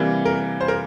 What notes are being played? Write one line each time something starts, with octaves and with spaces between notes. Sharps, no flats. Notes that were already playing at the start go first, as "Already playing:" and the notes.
Already playing: C3 E3 G3 A#3
A#4
C5
A#4